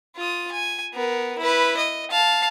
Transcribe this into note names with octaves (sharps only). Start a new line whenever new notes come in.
F4 D#6
G#5
B3 A#4
E4 B4
D#5
F5 A5